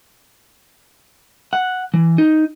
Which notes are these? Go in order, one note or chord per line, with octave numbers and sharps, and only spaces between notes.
F#5
E3
D#4